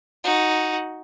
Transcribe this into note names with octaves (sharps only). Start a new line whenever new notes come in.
D#4 F#4